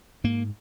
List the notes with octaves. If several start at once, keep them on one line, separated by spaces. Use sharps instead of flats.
G#2 A#3